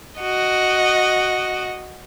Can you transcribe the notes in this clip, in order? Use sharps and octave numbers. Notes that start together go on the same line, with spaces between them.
F#4 D#5